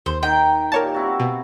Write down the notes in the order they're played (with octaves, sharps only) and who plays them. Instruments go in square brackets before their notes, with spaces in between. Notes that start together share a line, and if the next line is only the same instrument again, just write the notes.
[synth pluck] D#2 [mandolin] C5
[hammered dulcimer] D#3 [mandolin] G5
[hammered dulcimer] A#2 G4 [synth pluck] A#4 C#5 A5
[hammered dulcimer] C4 E4 F#4
[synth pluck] B2